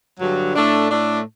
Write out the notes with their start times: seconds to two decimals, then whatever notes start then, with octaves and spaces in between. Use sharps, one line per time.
0.20 G2 D3 F#3
0.54 A2 A3 D4
0.89 A2 A3 D4